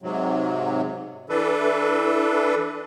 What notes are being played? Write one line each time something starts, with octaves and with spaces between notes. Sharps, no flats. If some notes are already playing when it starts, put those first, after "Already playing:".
G#2 C3 F#3
E3 D4 A4 B4